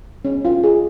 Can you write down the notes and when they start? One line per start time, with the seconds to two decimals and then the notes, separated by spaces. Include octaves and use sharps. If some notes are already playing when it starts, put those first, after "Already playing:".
0.25 C#4
0.45 F4
0.64 G#4